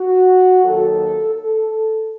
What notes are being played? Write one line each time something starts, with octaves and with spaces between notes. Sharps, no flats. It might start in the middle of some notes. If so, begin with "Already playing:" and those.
Already playing: F#4
D#2 D#3 F#3 A4
A4